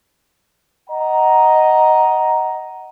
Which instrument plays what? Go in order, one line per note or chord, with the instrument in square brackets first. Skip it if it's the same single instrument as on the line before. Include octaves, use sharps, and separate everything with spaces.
[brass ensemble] D#5 F#5 A#5